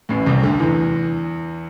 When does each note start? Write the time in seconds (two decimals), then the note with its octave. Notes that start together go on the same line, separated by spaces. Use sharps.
0.09 A1 A2
0.26 C2 C3
0.43 D2 D3
0.60 E2 E3